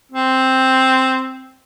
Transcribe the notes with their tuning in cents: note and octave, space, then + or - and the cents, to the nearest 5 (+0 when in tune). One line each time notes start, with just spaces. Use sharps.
C4 +0